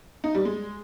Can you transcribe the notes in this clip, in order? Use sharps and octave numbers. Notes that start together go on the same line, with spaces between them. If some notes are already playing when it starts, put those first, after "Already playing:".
D#4
G3
G#3